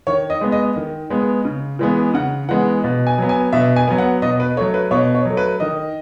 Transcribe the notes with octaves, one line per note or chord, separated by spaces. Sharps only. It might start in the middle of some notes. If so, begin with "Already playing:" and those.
D#3 C#5
D#5
G#3 B3
D#5
D#3
G#3 B3
C#3
E3 G#3 B3
C#3 F#5
E3 G#3 B3 F#5
B2
G#5
F#3 B3
G#5
B2 E5
G#5
F#3 B3
F#5
B2 D#5
B4
F#3 A3 C#5
B4
B2 C#5
C#5
F#3 A3
B4
D#3 D#5